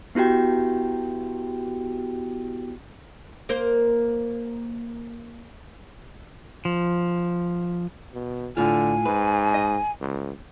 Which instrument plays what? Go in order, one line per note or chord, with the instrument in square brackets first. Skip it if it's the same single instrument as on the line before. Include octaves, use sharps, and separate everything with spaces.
[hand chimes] B3 E4 F#4 G4 G5
[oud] A#3 A#4 C5
[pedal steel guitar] F3
[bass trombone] B2
[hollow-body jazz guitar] A2 F4 [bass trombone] D3 [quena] G#5
[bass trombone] G#2 [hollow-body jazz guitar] B4
[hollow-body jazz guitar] D#5
[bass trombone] C#2